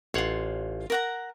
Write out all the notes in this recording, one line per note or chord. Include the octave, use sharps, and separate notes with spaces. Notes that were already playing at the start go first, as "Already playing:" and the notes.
A1 F4 C#5 F#5 C6
A#4 F#5 A#5